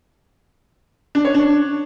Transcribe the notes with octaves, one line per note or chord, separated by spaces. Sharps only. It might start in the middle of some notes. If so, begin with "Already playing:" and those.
D4
C#5
D4